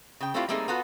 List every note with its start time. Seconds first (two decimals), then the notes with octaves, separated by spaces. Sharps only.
0.20 C#3 G5
0.34 A3 C4 D4 E4 F4 G4
0.49 G3 A3 A#3 C4 D#4 G#4
0.68 B3 F4 F#4 A4 B4